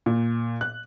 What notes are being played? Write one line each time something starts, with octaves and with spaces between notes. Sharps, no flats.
A#2
F#6